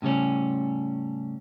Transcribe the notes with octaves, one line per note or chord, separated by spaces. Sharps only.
A2 C#3 G3 C#4